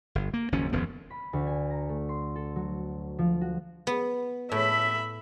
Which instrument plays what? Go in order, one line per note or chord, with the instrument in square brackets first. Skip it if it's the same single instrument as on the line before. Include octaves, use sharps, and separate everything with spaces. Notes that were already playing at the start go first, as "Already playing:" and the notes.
[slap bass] G1
A#3
F#1 D#2 F3 C#4
E1 D#2 F3 B3
[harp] B5
D2
G#5
A#5
A3
C6
A4
F#3
F3
F#4
[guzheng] B3
[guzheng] A2 [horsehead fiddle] E5 B5